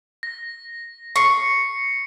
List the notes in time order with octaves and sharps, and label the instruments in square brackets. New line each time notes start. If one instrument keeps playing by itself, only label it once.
[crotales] A#6
[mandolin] C#6 [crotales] C7 C#7